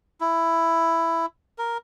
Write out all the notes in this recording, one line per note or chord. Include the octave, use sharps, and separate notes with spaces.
E4
A#4